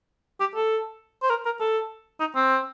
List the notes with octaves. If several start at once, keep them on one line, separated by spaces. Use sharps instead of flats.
G4
A4
C5
A#4
A#4
A4
D#4
C4